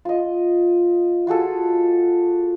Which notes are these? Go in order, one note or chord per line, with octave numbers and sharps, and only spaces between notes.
F4 D#5
F4 F#4 G#4 A4